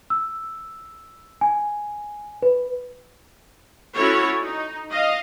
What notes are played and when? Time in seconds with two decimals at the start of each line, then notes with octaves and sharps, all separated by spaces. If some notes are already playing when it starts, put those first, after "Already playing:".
0.10 E6
1.41 G#5
2.42 B4
3.95 C#4 E4 F#4 A4 C#5
4.40 D#4
4.90 D#5 F5